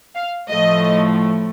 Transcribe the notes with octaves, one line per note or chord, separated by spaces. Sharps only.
F5
A2 F3 A3 D#5